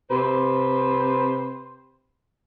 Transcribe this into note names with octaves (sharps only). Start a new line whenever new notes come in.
C3 B4 C5